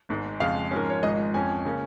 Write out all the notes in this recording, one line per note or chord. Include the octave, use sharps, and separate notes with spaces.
G#1 G#2 G#3
F2 C#3 G#3 F5
G#2 F3 G#3 C#4 A#4
C#5
G#1 G#2 F3 G#3 D#5
F2 F3 C#4 G#5
C#3 A#3 C#4